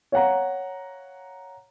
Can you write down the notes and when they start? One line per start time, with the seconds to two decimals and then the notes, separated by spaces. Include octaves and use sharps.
0.12 C#5 F5 F#5 A#5